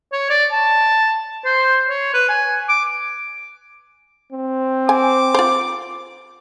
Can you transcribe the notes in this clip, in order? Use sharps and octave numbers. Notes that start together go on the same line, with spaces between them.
C#5
D5
A5
C5
C#5
B4
G#5
D6
C4
G#5 D6
F4 C5